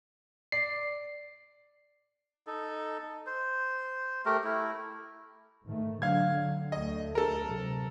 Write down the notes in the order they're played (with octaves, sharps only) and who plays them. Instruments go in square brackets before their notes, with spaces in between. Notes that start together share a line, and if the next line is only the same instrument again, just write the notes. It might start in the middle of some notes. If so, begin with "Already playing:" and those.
[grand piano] D5 [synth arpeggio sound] C7
[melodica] D#4 A4
C5
A3 G4 A#4
A3 E4
[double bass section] G#2 D#3 A3
[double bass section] D3 F#3 [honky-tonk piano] F5 G#6
[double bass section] D2 A3 [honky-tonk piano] D#5
[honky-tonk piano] A4 A#4
[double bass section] C3 F#3